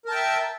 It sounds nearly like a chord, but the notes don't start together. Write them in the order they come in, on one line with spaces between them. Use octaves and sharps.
A#4 A5 G5 E5